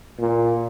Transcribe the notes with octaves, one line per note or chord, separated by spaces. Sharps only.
A#2